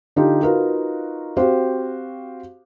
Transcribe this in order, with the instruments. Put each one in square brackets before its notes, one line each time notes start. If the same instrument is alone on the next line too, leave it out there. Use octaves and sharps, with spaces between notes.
[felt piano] D3 D#4 F4 G4
D#4 F4 F#4 A#4 B4 F5
C4 F#4 G4 C5 F5